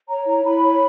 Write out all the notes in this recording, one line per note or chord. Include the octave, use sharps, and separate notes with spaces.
C#5 A#5
E4 A#5
E4 B5
C#5